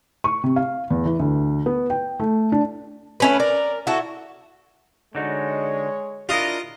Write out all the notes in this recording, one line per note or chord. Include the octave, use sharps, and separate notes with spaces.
C#6
C3
F5
E2
E3
D2
B3
G5
A3
D4
A3 C#4 B4
A#4 D5
E4 F#4 A4
D3 G#3 D#4 F#4 C#5
D4 E4 F4 A#4 D#5